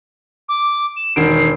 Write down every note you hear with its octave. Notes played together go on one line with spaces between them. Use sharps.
D6
E7
E1 D#3 C7 D7